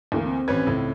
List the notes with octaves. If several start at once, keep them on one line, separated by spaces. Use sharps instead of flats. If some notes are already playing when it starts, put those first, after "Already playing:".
D2 E3 A#3
C4
A1 C#4 B4 G#6
C#2 A2